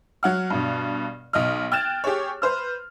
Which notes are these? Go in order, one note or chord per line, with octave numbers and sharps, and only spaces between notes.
F#3 F#5 F6
G2 B2
B1 D#5 F6
G5 F6 F#6 G#6 A6 E7
G4 G#4 C#5
B4 C5 F6